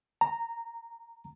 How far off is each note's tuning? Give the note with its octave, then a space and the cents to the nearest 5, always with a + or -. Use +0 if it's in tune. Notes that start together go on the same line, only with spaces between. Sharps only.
A#5 -15